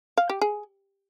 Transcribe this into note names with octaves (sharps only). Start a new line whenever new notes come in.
F5
G4
G#4